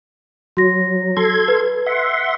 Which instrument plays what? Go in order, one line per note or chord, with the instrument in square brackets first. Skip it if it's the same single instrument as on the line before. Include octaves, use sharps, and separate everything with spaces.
[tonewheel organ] F#3 [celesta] F#4 A#6
[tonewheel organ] A4 C6 G#6
[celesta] B4
[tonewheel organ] E5 F#5 C6